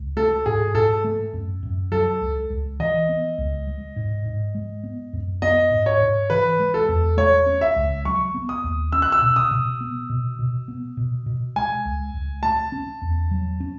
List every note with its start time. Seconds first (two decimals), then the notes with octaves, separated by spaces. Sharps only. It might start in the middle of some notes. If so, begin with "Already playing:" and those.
Already playing: C#2
0.16 A3 A4
0.46 G#2 G#4
0.75 G#2 A4
1.04 A3
1.33 F#2
1.63 F#2
1.92 F#3 A4
2.21 C#2
2.50 C#2
2.80 E3 D#5
3.09 B3
3.38 C#2
3.67 G#3
3.96 G#2
4.25 G#2
4.55 G#3
4.83 B3
5.13 F#2
5.42 B3 D#5
5.71 G#2
5.86 C#5
6.00 G#2
6.30 E3 B4
6.59 G#3
6.74 A4
6.88 E2
7.17 A3 C#5
7.46 C#4
7.61 E5
7.76 C#2
8.05 F#3 C#6
8.34 B3
8.49 D#6
8.64 D#2
8.92 C#4 E6
9.02 F#6
9.12 E6
9.22 B2
9.36 D#6
9.51 B2
9.81 B3
10.10 B2
10.39 B2
10.68 B3
10.97 B2
11.26 B2
11.56 G#3 G#5
11.85 C#2
12.14 C#2
12.43 A3 A5
12.72 C#4
13.02 E2
13.31 F#3
13.60 C#4